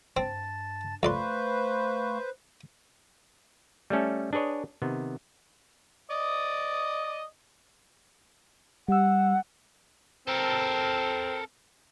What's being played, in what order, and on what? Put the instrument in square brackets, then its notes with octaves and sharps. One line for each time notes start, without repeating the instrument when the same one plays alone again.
[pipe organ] G2 A5 A6 [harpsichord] C4
[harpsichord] F2 D5 C6 [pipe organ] A3 F5 C#6 [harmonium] B4 C5
[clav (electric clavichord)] G3 A3 C#4 A4
D4 G#4 B4 C#5 D#5
C3 D#3 B3
[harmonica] D5 D#5 D#6
[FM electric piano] G3 E6 [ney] F#5
[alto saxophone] C4 [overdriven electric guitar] A4 A#4